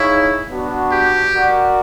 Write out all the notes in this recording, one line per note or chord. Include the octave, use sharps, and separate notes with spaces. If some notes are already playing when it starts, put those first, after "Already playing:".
Already playing: D#4 E4 G#4 C#5 F5
B3 D4 F#4
G4
F#4 A#4 D5 F#5